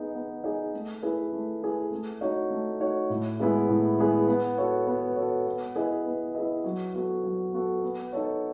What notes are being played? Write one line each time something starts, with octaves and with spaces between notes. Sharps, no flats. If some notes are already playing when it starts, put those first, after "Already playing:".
Already playing: B3 D#4 G#4
B3
D#4 G#4
A3
E4 G#4 B4
A3
E4 G#4 B4
A3
D#4 F#4 C#5
A3
D#4 F#4 C#5
A2
G#3 B3 E4 G#4
A2
G#3 B3 E4 G#4
B3
F#4 A4 C#5
B3
F#4 A4 C#5
B3
E4 G#4 B4 D#5
B3
E4 G#4 B4 D#5
F#3
B3 F#4 A4
F#3
B3 F#4 A4
B3
D#4 A4 C#5